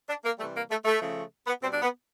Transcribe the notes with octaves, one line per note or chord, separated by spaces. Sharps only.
D4
A#3
C3 E3 G3 A3
A#3
A3
A3
C#3 F3 A3
B3
B2 G3 C4
D4
B3